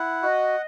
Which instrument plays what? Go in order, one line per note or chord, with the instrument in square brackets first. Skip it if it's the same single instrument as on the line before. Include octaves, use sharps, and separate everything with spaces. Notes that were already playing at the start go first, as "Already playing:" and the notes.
Already playing: [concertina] E4 F#5
[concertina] F#4 [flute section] D#5